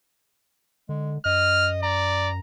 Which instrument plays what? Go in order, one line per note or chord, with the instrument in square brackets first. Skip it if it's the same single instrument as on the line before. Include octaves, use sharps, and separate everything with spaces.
[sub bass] D3 [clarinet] G#3
[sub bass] F#2 [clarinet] D#5 [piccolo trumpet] F6
[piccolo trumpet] D5 [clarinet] A#5